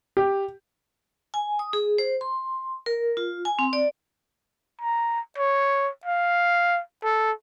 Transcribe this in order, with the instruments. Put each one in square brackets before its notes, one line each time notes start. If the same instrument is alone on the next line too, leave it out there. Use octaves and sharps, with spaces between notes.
[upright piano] G4
[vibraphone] G#5
D#6
G#4
C5
C6
A#4
F4
G#5
C4
D5
[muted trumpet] A#5
C#5
F5
A4